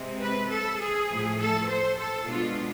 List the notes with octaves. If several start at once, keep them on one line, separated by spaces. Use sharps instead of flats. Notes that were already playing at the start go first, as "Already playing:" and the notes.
Already playing: C3 G#3 C4
B4
A4
G#4
A2 F3 A3
A4
C5
A4
B2 G#3 B3 D4 F4